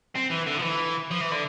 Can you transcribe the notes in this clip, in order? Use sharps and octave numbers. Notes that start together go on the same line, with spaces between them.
C4
E3
D3
F3
E3
F3
E3
D3